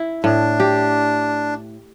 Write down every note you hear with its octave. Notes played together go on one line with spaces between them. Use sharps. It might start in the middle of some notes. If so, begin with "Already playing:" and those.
Already playing: E4
A2 D4
G4